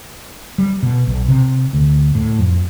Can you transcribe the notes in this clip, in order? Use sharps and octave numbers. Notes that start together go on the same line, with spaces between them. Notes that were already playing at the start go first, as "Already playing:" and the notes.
G3
B2
B1
C3
D2
A2
F2